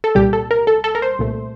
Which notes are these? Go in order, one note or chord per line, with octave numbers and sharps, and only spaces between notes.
A4
C2 A#2 G3 G4
A4
A#4
A4
A4
A#4
C5
C2 A#2 A3